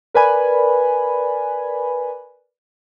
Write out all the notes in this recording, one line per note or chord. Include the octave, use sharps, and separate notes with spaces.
A#4 B4 D5 G#5 B5